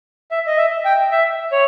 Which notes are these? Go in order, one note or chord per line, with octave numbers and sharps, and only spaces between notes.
E5
D#5
E5
G5
E5
C#5